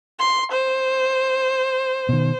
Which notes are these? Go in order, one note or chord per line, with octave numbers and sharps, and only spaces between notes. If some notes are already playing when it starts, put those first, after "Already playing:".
C6
C5
B2 D#3